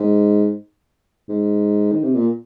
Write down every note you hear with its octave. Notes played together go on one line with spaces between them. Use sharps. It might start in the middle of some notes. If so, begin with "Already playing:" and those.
Already playing: G#2
G#2
D#3
C3
A#2